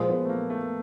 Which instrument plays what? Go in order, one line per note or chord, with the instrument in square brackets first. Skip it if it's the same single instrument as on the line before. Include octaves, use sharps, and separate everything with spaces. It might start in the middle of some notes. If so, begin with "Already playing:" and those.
Already playing: [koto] A#2 F3 G#3
[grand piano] B3
A3
A#3
A3